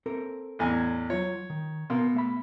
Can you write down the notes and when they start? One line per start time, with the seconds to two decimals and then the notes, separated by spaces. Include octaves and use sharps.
0.06 C4 A4 A#4
0.59 A1 E2 G#5
1.10 F#3 F4 C#5
1.50 D#3
1.90 B2 A#4 F5 C6
2.15 A3 E5 B5